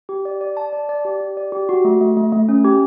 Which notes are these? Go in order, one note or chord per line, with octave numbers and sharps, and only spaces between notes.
G4
D5
D5
A5
D5
D5
G4
G4
D5
G4
F#4
A3
A3
A3
A3
C#4
G4